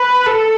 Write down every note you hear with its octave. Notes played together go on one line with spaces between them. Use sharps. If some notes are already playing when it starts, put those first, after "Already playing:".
Already playing: B4
A4